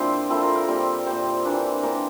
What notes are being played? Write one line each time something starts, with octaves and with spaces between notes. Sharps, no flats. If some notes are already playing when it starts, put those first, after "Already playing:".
Already playing: A#2 F3 C4 D4 E4 F4 C5 D5
A#2 F3 C4 E4 A4
A#4
A#4
A#2 G3 C4
A#2 G3 C4 C5
E3 A#3 D4
E3 A#3 D4 A#4